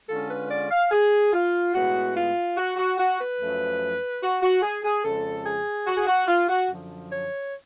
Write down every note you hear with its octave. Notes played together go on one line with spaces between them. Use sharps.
D3 G#3 C#4 F4 A4
B4
D5
F5
G#4
F4
A2 G#3 B3 F#4
F4
F#4
F#4
F#4
B4
F#2 F3 A3 C#4
F#4
F#4
G#4
G#4
F2 C#3 G#3 A4
G#4
F#4
G#4
F#4
F4
F#4
F#2 D3 F3
C#5